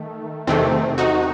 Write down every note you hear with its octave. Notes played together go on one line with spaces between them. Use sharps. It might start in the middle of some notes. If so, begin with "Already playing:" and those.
Already playing: D#3 A3
E2 C3 D#3 A3 C4
D#4 F#4